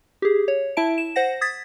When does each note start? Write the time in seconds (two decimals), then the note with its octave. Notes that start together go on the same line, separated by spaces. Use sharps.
0.22 G4 G#4
0.48 C#5
0.77 E4 E5 A5 D7
0.98 E7
1.16 C5 F#5 A#6
1.41 D#6 G#6 A6 B6